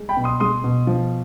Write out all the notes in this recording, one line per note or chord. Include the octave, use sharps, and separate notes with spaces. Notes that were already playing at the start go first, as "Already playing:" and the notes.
Already playing: G#3
G5 B5
B2
C6 D#6
G#3 C6 D#6
B2
F3